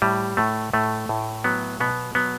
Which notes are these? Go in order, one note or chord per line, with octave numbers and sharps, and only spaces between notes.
A2 G3
A2 A3
A2 A3
A2
F#3 B3
B2 B3
F#3 B3